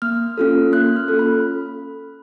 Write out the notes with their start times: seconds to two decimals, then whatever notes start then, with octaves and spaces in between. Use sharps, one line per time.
0.02 A#3 F6
0.38 C#4 F4 A4
0.72 A#3 F#6
0.96 F6
1.08 C#4 F4 A4
1.19 B5